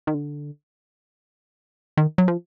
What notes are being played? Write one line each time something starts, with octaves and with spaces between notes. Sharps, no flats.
D#3
D3
D#3
F#3
F3